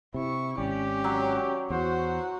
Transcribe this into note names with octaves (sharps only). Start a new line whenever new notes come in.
C3 E4 C#6
G#1 C#4 G4 D5
F#3
E2 F#4 C5